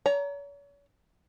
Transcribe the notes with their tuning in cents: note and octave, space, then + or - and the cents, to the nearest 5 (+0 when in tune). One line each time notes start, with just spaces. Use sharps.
C#5 +40 A#5 +0